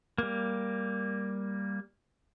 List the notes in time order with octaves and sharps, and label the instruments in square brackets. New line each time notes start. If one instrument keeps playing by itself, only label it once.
[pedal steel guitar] G3 A#3